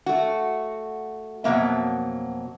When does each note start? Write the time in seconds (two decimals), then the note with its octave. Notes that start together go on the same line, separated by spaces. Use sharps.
0.06 A3 F#4
1.44 F2 B2 F#3 A#3 E5